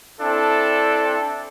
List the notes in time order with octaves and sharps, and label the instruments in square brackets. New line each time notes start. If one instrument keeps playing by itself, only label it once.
[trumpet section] C4 D4 E4 A4